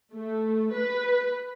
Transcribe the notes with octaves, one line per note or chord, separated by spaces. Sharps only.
A3
B4